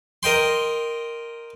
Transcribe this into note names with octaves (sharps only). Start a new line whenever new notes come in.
A#4 D#5 G5 C6